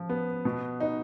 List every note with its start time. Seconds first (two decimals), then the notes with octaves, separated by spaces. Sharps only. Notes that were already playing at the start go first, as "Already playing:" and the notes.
Already playing: F3
0.09 B3
0.45 B2
0.80 D#4